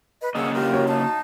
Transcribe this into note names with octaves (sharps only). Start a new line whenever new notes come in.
B4 D#5
C#3 A#3 G#4 D#5 F#5 E6
F4 G4 A#4
F#4 C#5
D#4 F5 A5